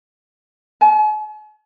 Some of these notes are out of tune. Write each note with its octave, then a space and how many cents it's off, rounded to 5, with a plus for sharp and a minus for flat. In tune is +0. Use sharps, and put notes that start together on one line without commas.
G#5 +45